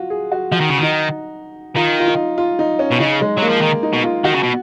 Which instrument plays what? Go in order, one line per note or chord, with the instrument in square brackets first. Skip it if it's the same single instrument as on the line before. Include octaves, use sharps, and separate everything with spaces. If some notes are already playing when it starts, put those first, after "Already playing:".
Already playing: [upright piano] F4 F#4
G#4
F#4
[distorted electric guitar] F3 [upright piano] F#4
[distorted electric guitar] D#3
C#3
[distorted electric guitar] D#3 [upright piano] D#4
[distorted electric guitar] D#3 [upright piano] F4
[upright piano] F4
D#4
F4
D#4
C#4
[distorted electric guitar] B2
[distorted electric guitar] C#3 [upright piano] D#4
[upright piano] G#3
[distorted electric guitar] F#3 [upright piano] A#3
[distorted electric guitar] F3
D#3
[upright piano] D#4
[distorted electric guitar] B2
[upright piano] F4
[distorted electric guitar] D#3 [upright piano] F#4
[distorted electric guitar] C#3
B2